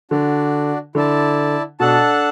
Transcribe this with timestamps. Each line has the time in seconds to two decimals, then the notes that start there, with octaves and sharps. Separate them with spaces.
0.11 D3 D4 F#4 D5
0.95 D3 E4 D5 A5
1.80 B2 D4 A4 F#5 A5